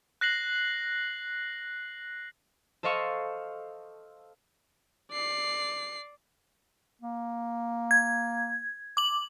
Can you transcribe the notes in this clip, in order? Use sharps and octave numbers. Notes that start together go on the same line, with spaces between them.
F#6 A#6 C7 F#7
A4 C5 D#5 F5 C#6 E6
D5 C7
A#3
G#6
D6 F#7